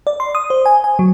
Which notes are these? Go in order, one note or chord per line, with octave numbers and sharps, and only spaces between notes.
D5
C6
D#6
C5
G#5
G#5
F#3